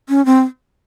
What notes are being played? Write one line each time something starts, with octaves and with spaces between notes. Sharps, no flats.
C#4
C4